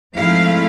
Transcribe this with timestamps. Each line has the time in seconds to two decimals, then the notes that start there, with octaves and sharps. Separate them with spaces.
0.14 G#2 F3 A3 C4 E4 F5